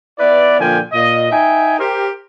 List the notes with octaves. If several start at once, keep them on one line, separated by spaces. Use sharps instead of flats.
B3 E4 B4 D5
A#2 D3 F3 F5 G5 G#5
A#2 D#5
D#4 E5 G5 G#5
G4 A#4 C5